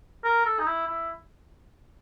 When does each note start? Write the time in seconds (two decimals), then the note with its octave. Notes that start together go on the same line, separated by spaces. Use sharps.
0.24 A#4
0.45 A4
0.60 D#4
0.67 E4
0.88 E4